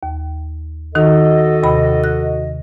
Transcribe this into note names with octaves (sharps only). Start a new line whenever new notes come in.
D#2
D#3 D#4 F#4 A4 D#5
D#2 C3 B5
F#6